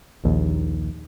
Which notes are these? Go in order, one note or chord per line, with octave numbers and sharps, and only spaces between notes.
A#1 D#2